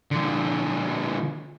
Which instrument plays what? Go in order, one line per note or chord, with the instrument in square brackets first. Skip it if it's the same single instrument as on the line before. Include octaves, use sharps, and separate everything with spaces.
[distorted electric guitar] D3 F3